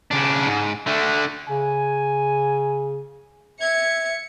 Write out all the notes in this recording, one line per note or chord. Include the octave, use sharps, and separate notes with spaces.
C#3 D4
G#2
D3 A3
C#3 G#5
E5 G#6 C#7